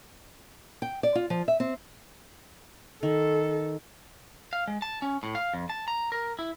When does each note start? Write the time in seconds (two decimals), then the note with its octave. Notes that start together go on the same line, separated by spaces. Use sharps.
0.82 G5
1.03 D5
1.15 F4
1.30 F3
1.48 E5
1.60 C4
3.03 D#3 A4
4.53 F5
4.68 G#3
4.82 A5
5.02 C#4
5.23 A2
5.35 F5
5.54 F2
5.70 A5
5.88 A#5
6.12 A#4
6.39 E4